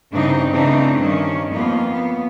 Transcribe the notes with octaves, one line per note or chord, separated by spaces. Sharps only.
G2 C#3 E3 C4 D4 D#4
C#3 E3 A3 C4 D4 D#4
G2 D#3 C#4
F2 A#3 B3 F4
B3